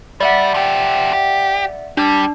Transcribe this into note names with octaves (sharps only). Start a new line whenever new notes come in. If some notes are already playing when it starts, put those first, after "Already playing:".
G3 D5 E5 F#5
F3 G4
G4
G3 D4 G4